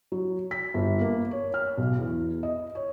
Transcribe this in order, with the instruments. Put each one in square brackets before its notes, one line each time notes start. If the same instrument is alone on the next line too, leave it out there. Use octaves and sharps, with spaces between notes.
[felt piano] F#3
B6
G1
A#3
C#5
F6
B1
E2
D#5
C#5